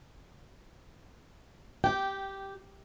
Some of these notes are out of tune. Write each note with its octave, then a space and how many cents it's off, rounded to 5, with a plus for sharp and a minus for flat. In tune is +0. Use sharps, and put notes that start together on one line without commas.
G4 -5 G5 -15